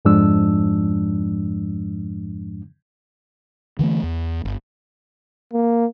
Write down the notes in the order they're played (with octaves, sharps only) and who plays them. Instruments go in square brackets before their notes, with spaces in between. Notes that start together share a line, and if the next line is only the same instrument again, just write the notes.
[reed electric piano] F2 G#2 F3 G#3 D4 E6
[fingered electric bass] D3 E3 G3 A3
E2
G1
[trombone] A#3